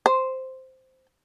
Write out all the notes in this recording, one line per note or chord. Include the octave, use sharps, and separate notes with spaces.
C5